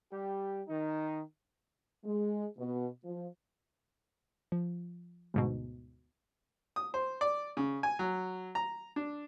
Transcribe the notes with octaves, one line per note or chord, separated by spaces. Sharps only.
G3 G4
D#3 D#4
G#3
B2
F3
F3
D2 G#2 B2
D#6
C5
D5
C#3
G#5
F#3
A#5
D4